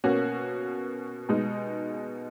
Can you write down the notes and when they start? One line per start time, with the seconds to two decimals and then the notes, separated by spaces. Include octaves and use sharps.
0.04 B2 A#3 C#4 F#4 C#5
1.29 B2 G#3 D#4